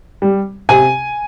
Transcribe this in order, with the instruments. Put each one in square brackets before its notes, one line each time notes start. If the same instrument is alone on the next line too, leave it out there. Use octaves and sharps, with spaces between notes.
[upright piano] G3
C3 G#5